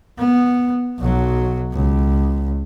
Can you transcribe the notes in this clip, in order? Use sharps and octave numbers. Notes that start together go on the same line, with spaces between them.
B3
B1 F#3
C#2